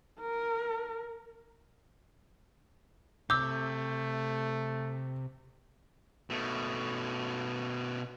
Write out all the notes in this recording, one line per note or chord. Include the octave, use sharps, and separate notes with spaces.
A#4
C3 A3 D6 E6 G6
B2 A3